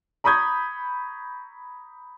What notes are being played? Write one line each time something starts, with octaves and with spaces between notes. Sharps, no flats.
A#5 B5 C#6 D#6 G6 G#6